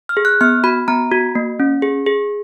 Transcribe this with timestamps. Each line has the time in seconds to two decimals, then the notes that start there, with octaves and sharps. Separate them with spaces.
0.09 F6
0.17 G#4
0.25 F#6
0.41 B3 F6
0.64 F#4 B5
0.88 B3 A#5
1.12 F#4
1.35 A#3
1.60 C#4
1.82 G#4
2.06 G#4